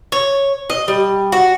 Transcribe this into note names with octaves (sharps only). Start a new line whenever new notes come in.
C#5
D#5
G3
F#4